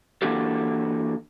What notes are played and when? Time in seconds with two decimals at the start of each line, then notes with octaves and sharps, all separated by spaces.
0.22 E3 A#3 D4 F#4 G4 A4